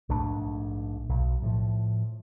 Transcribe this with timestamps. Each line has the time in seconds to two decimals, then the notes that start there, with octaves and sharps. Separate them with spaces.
0.09 A#1 G#2 A3 D4
1.09 B1
1.42 A2 F3